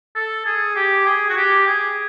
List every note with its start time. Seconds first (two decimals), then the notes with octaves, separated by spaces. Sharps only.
0.16 A4
0.46 G#4
0.76 G4
1.06 G#4
1.30 F#4
1.37 G4
1.67 G#4